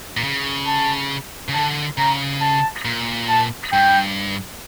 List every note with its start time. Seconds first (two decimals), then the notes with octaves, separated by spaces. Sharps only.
0.17 A#2
0.24 C#3
0.67 A5
1.49 C#3
1.54 D3 A5
1.98 C#3 A#5
2.41 A5
2.85 A#2
3.29 A5
3.72 G2 G5